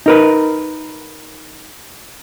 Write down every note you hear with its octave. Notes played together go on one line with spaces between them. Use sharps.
D#4 A#4 B4